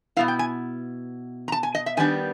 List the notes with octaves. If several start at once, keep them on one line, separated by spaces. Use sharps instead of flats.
B2 G3 B3 E4 F5
G5
G#5
A#5
A5
G#5
D#5
E5
D#3 G3 B3 D4 G#5